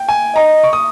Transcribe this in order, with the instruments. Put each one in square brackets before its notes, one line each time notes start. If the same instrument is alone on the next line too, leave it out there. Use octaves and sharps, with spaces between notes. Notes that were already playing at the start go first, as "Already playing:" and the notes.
Already playing: [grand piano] G5
G#5
[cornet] D#5 [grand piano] A#5
[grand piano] C#6
D#6